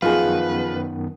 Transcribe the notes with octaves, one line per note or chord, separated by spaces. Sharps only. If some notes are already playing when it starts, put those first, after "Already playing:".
F#2 D#3 F3 B3 F4 G#4 B4